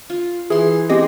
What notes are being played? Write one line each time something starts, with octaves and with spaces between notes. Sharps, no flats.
F4
E3 G#4 C6
G#3 C4 G4 D#5